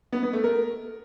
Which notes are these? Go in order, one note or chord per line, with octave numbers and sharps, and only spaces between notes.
B3
B3
A3
A#4